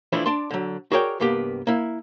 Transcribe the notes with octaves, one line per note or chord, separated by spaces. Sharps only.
E3 F3 A3 D4 E4 F4
D4 D5 A5 C6
D3 F#3
F#4 G#4 A#4 C#5 D5 G5
C2 G2 A#3 B3 G4
A#3 E4